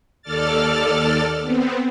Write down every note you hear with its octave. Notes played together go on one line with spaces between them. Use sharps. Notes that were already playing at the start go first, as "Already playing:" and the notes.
D#2 A4 D5 F6 A6
B3 C4